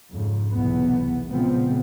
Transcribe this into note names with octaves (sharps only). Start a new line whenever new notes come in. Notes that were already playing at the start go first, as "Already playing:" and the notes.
F2 G#2 C#3
F1 B1 E2 B3
A#2 C#3 F3 G#3 B3 C4